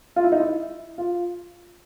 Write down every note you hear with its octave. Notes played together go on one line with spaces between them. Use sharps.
F4
E4
D#4
E4
F4